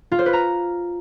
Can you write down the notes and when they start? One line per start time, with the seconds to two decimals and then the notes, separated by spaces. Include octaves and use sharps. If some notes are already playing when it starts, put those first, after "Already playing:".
0.12 F4
0.19 C5
0.26 B4
0.33 A#5